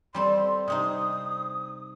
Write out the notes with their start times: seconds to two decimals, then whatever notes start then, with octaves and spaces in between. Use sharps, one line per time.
0.15 G3 C4 A4 C6
0.68 C3 C4 D#4 D#6